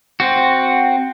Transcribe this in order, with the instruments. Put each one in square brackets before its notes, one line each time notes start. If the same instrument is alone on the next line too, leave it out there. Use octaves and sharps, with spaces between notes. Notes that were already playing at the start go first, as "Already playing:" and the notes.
[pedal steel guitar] C4 F#4